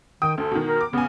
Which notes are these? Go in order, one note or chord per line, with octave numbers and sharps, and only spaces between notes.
D#3 G5 D#6
D2 A4
B2 D#3
A#4
D6
C#3 B3 G#5